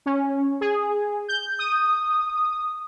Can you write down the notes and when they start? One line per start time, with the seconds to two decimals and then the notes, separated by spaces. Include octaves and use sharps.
0.06 C#4
0.61 G#4
1.28 G6
1.59 D#6